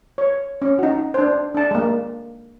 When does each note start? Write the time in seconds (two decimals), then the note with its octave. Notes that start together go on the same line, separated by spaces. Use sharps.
0.18 C#5
0.62 C#4
0.79 D#4 F#4
1.14 D4 C5
1.54 D4 A5
1.71 G#3 A#3